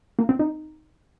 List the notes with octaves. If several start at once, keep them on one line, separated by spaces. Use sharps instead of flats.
A#3
C4
D#4